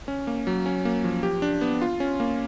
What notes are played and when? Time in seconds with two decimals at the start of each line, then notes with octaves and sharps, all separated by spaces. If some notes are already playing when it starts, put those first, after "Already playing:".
0.08 C#4
0.27 A#3
0.47 F#3
0.66 C#4
0.85 A#3
1.04 F3
1.23 G4
1.42 D4
1.61 B3
1.81 F4
2.00 C#4
2.20 A#3